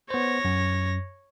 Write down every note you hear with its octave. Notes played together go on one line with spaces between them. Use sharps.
B3 C5 C#5 A#6
F#2